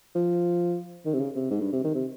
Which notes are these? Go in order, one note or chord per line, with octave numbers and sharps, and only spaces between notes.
F3
D#3
C3
C#3
C3
G#2
G2
C3
D#3
C3